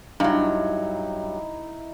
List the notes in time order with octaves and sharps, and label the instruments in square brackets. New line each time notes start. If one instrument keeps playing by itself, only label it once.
[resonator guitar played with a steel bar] G2 F#3 [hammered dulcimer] D#4 E4